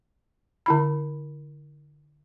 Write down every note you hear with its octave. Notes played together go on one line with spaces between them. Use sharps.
D3 E4 B5